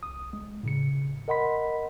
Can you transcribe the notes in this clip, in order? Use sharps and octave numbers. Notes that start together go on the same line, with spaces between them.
C2 D#6
G#3
A2 C#3 C#7
A#4 D#5 F#5 B5 C6 B6